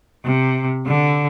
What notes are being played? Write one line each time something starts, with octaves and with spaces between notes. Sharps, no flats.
C3
D3